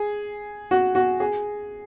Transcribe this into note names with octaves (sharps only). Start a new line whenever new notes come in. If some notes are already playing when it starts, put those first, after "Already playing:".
Already playing: G#4
F#4
F#4
G#4